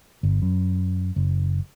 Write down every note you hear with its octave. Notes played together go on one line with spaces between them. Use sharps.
G1
F#2
F#1